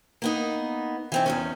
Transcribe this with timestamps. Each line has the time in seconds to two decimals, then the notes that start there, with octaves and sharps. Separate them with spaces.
0.22 A#3 B3 D#4
1.12 E3 C4 D#4
1.26 E2 G#2 C#4